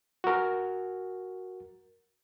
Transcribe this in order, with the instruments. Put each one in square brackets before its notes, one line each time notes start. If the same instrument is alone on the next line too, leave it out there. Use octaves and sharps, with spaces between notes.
[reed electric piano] F#4 A#4